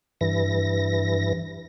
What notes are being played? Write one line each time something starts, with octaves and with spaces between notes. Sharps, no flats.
G2 E3 A#6